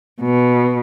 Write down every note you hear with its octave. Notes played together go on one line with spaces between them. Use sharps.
B2